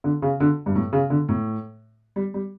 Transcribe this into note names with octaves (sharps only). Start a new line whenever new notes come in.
D3
C#3
D3
G2
A2
C#3
D3
A2
G3
G3